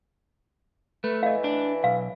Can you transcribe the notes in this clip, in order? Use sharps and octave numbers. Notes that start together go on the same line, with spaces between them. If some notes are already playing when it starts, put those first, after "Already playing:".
A3 B4
E3 D#5 F5
D4
B1 F5